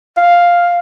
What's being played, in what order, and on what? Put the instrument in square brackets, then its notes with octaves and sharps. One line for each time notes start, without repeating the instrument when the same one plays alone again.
[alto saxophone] F5